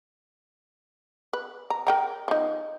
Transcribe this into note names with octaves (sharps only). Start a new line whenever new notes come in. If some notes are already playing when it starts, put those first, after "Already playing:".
B4
A#5
A#4 G5 A#5
F3 D#4